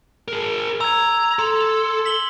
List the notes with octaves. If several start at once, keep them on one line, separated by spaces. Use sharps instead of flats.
G#4 A#4
A#5 E6 G#6
A4 C6
B6 F#7 G7